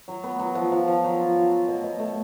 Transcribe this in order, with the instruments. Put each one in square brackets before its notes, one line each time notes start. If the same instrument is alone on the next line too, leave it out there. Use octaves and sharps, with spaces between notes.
[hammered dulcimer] F#3
B3
F#3
F3
F3
F3
F#3
F4
F#3
F#4
B2
B2
A3